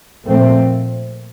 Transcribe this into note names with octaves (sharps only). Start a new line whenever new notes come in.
A#2 F3 A3 C4